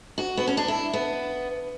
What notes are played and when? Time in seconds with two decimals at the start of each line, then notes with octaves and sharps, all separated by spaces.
0.18 F#4
0.37 B3
0.47 C#4
0.57 D4
0.68 E4
0.93 B3